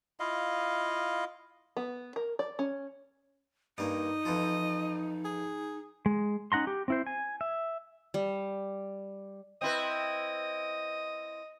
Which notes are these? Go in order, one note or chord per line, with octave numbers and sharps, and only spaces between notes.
E4 F4 D#5 F5
B3
A#4
D5
C#4
G2 A#3 D#4 D#5
F2 E3 F3
G#4
G#3
C#4 D#4 F#5 A#5 C6
G4
C4 E4 C5
G#5
E5
G3
C4 E4 B4 D#5